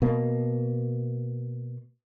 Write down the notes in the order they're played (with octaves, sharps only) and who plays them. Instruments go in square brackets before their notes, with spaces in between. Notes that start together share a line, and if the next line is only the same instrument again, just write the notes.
[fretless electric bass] B2 A#3